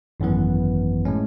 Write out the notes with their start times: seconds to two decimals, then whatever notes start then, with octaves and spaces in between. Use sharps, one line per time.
0.20 G#1 F#2 E3 B3
1.05 A2 G#3 C#4